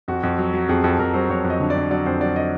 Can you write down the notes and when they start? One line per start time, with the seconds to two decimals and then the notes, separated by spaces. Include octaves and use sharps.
0.08 F2 F#4
0.23 F2
0.38 F#3
0.53 F#3
0.69 F2 G#4
0.84 F2 A4
0.99 F2 A#4
1.14 F#3 C5
1.29 F2 C#5
1.44 F2
1.50 D#5
1.60 D3
1.70 F2 D5
1.91 F#3 D5
2.06 F2 C5
2.21 F#3 D5
2.36 D#5